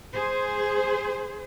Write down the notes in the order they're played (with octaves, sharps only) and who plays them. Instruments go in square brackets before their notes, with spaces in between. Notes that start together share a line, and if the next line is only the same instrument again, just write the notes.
[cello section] G#4 C5